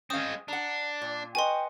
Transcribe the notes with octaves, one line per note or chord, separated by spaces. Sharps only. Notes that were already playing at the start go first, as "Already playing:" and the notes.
G#3 C4 C#4 F5 D#6
D4 F#5 A#5
A#2
F#4 B4 D#5 G5 G#5 C6